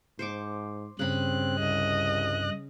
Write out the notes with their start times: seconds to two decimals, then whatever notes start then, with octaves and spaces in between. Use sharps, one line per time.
0.19 G#2 C5 C#6 D6
0.99 G2 C#3 C4 B5 F#6
1.59 C2 D#5